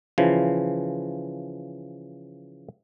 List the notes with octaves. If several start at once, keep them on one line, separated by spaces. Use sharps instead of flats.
C#3 E3 F3